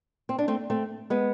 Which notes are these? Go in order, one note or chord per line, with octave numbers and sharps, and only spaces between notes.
C4
D4
A3 C4
A3 C4
G#3 B3